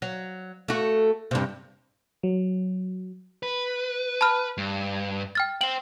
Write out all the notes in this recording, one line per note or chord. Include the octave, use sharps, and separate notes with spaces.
F#3
A3 F#4
G2 C3
F#3
B4
A5 B5 F6
G2
G5 F6 A6
C5 G5 F#7